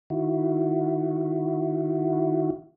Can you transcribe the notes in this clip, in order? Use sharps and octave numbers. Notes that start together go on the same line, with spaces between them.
D#3 E4 F#4